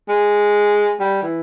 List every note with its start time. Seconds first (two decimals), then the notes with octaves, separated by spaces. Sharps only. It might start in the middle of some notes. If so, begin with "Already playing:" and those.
0.09 G#3
1.00 G3
1.23 E3